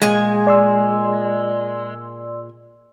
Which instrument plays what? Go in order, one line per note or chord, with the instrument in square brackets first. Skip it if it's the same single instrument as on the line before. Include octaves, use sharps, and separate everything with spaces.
[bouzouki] A#2 G#4 G#5 [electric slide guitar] G#3
[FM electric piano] D5 C6 E6